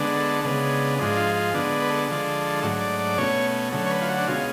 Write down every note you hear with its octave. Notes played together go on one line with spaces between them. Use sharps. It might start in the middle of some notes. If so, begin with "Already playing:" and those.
Already playing: D3 G#3 B3 D4
A4
C#3 G#3 B3 D4
G#2 F3 G#3 D4
F4
F4
D3 G#3 B3 D4
B4
A4
D3 F3 G#3 D4
G#2 F#3 A3 D4
D5
D5
B2 A3 C#4 C#5
D3 F#3 A3 C#4
C#5
B4
F4
F#4
D4
B2 G#3 C#4 F4